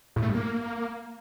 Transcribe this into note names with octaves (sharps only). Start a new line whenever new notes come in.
A2
A3
G2
A#3